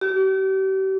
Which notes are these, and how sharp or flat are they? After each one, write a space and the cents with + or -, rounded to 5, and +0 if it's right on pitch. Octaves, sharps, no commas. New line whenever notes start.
G4 -40